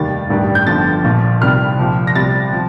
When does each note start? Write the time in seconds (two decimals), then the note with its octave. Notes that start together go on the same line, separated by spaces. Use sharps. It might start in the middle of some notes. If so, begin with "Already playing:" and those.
Already playing: F1 D#2 D#3 G3 A6
0.30 A1 G2 D#3 G3
0.55 G6
0.67 G1 G2 D3 F3 A6
1.04 A#1 A#2 F3
1.41 C2 C3 D#3 G3 F6
1.79 C2 A#2 F3
2.07 A#6
2.15 C2 C3 G3 A6
2.53 F3